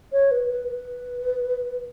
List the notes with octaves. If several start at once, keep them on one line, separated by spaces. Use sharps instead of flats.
C#5
B4
B4
B4